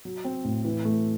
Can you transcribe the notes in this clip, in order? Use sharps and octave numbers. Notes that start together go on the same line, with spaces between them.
F#3
C4
A2
E3
A3